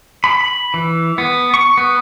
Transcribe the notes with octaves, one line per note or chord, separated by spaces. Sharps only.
B5
B5
E3
B3
C#6
B3